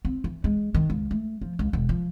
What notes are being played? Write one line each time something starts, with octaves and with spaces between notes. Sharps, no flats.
C4
E3
G#3
D#3
C#2
A3
F3
C#2
E1
F3